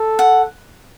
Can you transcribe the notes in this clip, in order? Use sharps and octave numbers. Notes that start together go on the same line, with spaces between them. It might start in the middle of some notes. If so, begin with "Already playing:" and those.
Already playing: A4
F#5